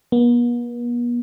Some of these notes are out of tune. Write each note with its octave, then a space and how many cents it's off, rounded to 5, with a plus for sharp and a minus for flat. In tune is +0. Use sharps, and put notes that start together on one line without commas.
B3 -45